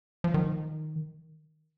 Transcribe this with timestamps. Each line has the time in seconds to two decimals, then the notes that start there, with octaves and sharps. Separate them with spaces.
0.24 F3
0.34 D#3